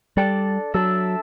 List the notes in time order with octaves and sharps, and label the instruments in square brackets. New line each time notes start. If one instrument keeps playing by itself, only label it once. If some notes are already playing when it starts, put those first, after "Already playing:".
[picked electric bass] G3 [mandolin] D4 A4 D5
[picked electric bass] F#3 [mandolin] D4 A4 E5